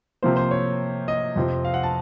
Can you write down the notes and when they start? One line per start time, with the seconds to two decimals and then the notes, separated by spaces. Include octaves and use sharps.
0.23 C3 F3 A#3 C5
0.37 C5
0.51 C#5
1.08 D#5
1.36 F2 C3 F3 C4
1.65 F5
1.74 F#5
1.83 A5